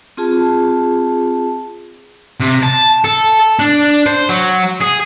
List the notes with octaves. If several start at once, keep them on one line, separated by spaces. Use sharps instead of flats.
C4 F4 G#4 A5
C3
A5
A4
D4
C5
F#3
G#4